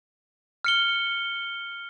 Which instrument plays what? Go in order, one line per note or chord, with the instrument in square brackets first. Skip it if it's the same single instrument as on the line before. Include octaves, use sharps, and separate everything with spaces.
[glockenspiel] F6 C#7 G7